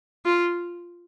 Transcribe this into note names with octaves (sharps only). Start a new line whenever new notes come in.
F4